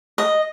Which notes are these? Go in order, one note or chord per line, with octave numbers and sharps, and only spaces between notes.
D#5